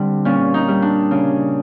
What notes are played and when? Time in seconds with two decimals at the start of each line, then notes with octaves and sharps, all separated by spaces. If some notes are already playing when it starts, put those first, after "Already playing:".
Already playing: D3 G3 C4
0.25 A#2 C#4
0.54 D#4
0.68 G3
0.82 D4
1.11 C#3